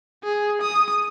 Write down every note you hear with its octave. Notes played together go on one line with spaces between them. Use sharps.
G#4
D#6